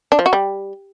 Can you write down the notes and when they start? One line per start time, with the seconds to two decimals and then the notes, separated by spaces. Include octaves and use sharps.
0.12 D4
0.19 F3
0.26 F#4
0.33 G3